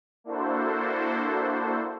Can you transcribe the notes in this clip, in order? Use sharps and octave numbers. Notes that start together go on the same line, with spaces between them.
A#3 D4 E4 F#4 A4 C5